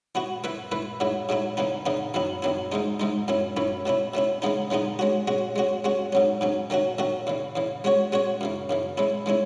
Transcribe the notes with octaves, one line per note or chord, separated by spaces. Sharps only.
E3 B3 F#4
E3 A3 E4 B4
E3 A3 E4 B4
G#2 F#3 A3 E4
G#2 F#3 A3 E4
E2 C#3 E3 B3 D#4
E2 C#3 E3 B3 D#4
F#2 D#3 F#3 B3 E4
F#2 D#3 F#3 B3 E4
G#2 E3 G#3 D#4
G#2 E3 G#3 D#4
F#2 E3 A3 C#4 E4
F#2 E3 A3 C#4 E4
B2 A3 C#4 E4
B2 A3 C#4 E4
C#3 E3 G#3 B3 D#4
C#3 E3 G#3 B3 D#4
G#3 C#4 F#4
G#3 C#4 F#4
G#3 C#4 F#4
G#3 C#4 F#4
G#2 F#3 C#4
G#2 F#3 C#4
D#3 A3 C#4 F#4
D#3 A3 C#4 F#4
E2 C#3 E3
E2 C#3 E3
G#3 C#4 F#4 C#5
G#3 C#4 F#4 C#5
F#2 C#3 E3
F#2 C#3 E3
E3 G#3 C#4 E4
E3 G#3 C#4 E4